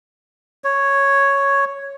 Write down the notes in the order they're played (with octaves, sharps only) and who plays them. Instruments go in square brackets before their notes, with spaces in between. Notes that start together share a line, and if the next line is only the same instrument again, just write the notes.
[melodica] C#5